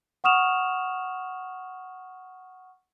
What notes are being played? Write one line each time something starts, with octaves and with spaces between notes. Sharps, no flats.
F#5 C#6 D#6 F6 E7 F7